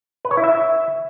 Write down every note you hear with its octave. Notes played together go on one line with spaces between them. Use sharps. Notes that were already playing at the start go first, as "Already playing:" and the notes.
B4
C#5
E4
E5